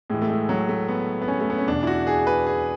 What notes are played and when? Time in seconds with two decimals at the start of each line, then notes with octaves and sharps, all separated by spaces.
0.10 A2 E3 G#3
0.22 A3
0.30 G#3
0.49 F#3
0.69 A3
0.88 B3
1.22 B3
1.28 C#4
1.41 A3
1.50 B3
1.58 C#4
1.68 E2 B2 D4
1.83 E4
1.87 F#4
2.07 G#4
2.27 B4
2.47 G#4